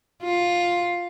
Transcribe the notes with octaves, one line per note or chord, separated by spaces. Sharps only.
F4